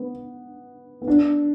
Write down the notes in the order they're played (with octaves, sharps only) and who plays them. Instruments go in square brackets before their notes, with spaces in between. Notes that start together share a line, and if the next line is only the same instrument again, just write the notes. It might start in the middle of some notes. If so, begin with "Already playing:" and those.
Already playing: [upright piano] B3
B3
D4